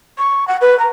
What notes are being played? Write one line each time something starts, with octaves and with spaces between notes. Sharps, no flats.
C#6
F#5
B4
A#5